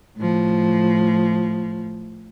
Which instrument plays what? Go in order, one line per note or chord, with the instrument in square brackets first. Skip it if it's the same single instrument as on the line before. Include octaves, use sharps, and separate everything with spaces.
[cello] A2 F3